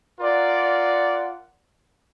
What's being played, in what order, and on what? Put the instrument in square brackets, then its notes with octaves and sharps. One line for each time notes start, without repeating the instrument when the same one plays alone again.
[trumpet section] F4 A#4 D5 F#5